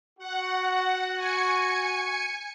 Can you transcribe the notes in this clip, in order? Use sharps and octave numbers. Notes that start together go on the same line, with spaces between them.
F#4 F#5
G#5 C#7